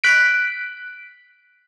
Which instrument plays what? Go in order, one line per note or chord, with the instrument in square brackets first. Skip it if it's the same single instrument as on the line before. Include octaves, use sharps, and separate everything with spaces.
[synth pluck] F#6 B6 D7